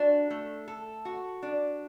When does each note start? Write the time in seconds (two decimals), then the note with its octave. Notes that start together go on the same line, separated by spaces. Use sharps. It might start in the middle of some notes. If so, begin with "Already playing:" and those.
Already playing: D4 F#4
0.30 A3
0.68 A4
1.05 F#4
1.43 D4